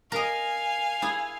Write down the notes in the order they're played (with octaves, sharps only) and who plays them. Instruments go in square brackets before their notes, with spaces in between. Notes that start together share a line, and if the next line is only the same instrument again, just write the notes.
[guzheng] A#4 D#5 [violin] F5 G#5
[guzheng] E4 G#4